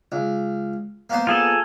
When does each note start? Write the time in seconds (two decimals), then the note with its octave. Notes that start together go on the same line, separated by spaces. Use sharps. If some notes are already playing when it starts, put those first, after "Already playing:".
0.12 C#2
1.10 A#3 B3 C5
1.27 F4 G#4 A4